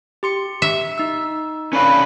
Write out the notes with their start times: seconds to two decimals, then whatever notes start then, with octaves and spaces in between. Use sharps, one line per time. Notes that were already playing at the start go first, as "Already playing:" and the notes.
0.23 G4 C6 C#7
0.62 E5
0.98 D#4 E6
1.73 C#4 D4 B4 F5